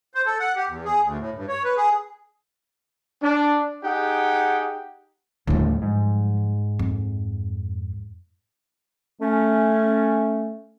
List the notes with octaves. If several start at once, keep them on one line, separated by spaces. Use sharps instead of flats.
C5
A4
F#5
G4
E2
G#4
D2
A2
G2
C#5
B4
G#4
D4
D#4 G4 G#4 F#5 G5
D#2 A2 D3 F3 G3
G#2
F2
A3 C#4